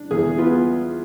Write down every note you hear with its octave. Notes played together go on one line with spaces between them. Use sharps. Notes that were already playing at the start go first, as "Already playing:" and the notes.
Already playing: D4
E2 G#4
B3 F4